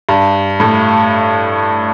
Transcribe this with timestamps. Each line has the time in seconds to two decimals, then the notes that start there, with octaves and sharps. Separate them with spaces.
0.09 G2
0.60 A2